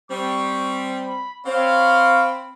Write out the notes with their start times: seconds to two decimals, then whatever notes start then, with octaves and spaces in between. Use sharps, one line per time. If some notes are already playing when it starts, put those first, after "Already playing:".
0.11 G3 C4 C#6
1.07 B5
1.46 C4 C#5 F5 B5